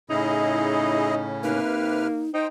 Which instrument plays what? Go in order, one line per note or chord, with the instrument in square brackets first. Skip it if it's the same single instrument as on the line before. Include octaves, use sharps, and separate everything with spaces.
[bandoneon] A2 C#3 C#4 [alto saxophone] D#4 [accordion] E4 G#4 D#5
[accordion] C3 B4 F6 [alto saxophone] A#3 [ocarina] D#4
[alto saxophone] D#4 [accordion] C5 G5